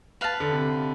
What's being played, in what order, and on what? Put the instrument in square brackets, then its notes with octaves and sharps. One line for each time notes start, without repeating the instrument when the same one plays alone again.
[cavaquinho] B4 F5 A5
[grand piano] D3
C3